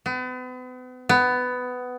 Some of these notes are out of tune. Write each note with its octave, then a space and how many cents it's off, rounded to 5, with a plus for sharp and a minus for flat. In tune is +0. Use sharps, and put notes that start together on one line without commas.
B3 +40
B3 +15